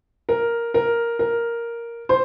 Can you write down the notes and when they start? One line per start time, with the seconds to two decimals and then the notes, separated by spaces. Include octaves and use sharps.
0.29 A#4
0.74 A#4
1.19 A#4
2.09 C5